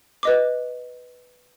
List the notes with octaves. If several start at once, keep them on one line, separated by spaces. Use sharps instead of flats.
B4 D#5 D6